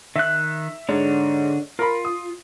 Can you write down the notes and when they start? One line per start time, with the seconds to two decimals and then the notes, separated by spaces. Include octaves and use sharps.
0.16 D#3 E5 F#6
0.89 G#2 D3 D4 C#5
1.79 F4 A#4 B5
2.05 D#6